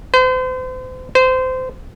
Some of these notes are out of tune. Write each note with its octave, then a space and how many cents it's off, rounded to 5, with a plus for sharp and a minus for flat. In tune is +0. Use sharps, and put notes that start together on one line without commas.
C5 -40
C5 -25